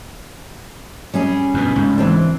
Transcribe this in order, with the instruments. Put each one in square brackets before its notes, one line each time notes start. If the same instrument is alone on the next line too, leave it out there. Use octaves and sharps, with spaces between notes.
[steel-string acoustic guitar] G3 C#4 G#4
[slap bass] G2 B2
C#2 G#2
[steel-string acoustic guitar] E3 C4 D4